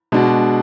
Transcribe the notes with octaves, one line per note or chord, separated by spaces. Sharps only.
B2 G#3 D4 F#4